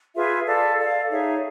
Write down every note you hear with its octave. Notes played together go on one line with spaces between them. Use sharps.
F4 G#4 B4 E5
A4 D5 F5
A4 D5 F5
D#4 G#4 C#5 E5